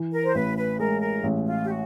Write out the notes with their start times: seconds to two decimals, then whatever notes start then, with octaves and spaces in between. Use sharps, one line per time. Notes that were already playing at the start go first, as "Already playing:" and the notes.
Already playing: E3
0.12 A#4
0.24 C5
0.34 A1 B4
0.57 B4
0.79 G#3 A#4
1.01 A#4
1.23 A1
1.46 F4
1.63 G4
1.68 F#4